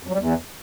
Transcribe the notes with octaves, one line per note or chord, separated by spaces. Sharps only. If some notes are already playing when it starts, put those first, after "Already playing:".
F2
F#3
G3
E2